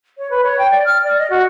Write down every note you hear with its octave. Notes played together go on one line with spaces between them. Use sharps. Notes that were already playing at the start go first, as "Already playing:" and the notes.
C#5
B4
C#5
G5
D5
F6
D5
D#5
F#4